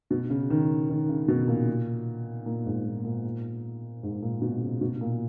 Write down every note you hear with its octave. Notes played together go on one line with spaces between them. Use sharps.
B2
C#3
D#3
D#3
C#3
B2
A#2
A#2
G#2
A#2
A#2
G#2
A#2
B2
C#3
B2
A#2